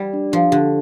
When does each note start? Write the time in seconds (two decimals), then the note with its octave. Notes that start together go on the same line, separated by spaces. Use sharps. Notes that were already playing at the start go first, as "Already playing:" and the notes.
Already playing: G3 D5
0.13 D4
0.32 F3 D4
0.51 D3 G4